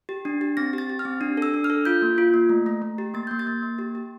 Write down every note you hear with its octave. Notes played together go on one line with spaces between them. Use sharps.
G4
D4
G4
C4 A#6
G4
A6
G4
F6
C4
D4
A4 E6
D4
F6
A4
F4 G6
A#3
F4
A#3
A3
A3
A3
G4
A#3 A6
A#3 G6
A6
A#3
A#3
G4
G4